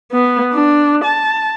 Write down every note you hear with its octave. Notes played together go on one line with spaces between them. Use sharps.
B3
D4
A5